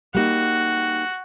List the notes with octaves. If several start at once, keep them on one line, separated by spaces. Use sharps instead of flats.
G3 A#3 D#4 F#4